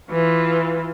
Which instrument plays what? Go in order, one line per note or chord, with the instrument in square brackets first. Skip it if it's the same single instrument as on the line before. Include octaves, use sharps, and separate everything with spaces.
[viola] E3 F4